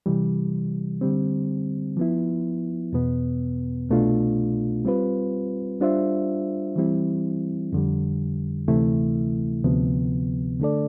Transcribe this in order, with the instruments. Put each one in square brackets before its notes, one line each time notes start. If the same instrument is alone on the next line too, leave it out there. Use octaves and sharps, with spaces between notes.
[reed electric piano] C3 E3 G3
D3 G3 C4
F3 B3 E4
E2 B2 B3
C2 B2 A3 D4 F4
G3 C4 F4 B4
G3 D4 F4 C5 E5
E3 G3 C4 E4
F2 D3 G3
D2 C3 E3 A3 E4
D2 C3 F3 B3
D3 A3 D4 A4 D5